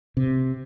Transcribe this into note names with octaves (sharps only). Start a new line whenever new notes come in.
C3